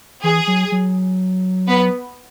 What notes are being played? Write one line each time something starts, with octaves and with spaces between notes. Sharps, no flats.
E3 G#4
F#3
F#3
B3 B4